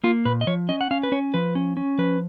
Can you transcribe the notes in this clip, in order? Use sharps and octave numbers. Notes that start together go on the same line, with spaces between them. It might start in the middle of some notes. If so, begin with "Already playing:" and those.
A#3 F4
A#2 B4
D#5
F3 C#5
C#4 D#5
F#5
C#4 F5
B4
C#4 C#5
F3 B4
C#4
C#4
F3 B4